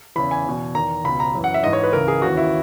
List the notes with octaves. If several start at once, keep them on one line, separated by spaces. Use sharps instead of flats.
E2 C#3 E3 B5
G#5
E2 B2
E2 D#3 A#5
C#2 B2 B5
A#5
F#2 E3
F#5
E5
G#2 E3 D#5
C#5
B4
C#2 C#3 E3 A#4
G#4
D#2 C#3 E3 F#4
E4